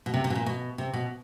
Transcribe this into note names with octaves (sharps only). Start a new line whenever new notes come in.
B2
C3
C3
B2
A#2
B2
C3
B2